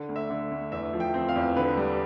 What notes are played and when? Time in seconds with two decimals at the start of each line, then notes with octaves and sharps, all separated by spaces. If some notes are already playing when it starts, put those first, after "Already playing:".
Already playing: D3
0.09 D2
0.16 E5
0.30 D3
0.51 D2
0.72 E2 E5
0.93 F3
1.00 G5
1.14 C4
1.28 F5
1.36 E2
1.56 D3 B4
1.77 G3